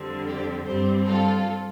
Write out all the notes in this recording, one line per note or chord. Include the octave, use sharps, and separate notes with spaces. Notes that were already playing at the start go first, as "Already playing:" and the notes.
Already playing: F2 D3 G3 C4
G4
G2 G3 C4 G4 C5
F4 A4